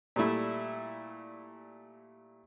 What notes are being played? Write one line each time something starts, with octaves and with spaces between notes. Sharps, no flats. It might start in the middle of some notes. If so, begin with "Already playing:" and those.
A#2 G3 A3 E4